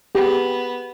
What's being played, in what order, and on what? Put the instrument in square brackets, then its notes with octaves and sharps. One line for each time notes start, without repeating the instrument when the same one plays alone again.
[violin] B3 [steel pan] G4 G#4